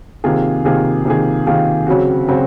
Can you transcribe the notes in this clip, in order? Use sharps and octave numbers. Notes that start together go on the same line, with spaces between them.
C3 D#3 A#3 F4 G#4
C3 D#3 A#3 F4 G#4
C3 D#3 A#3 F4 G#4
C3 D#3 A#3 F4 G#4
C#3 F#3 C4 F#4
C#3 F#3 C4 F#4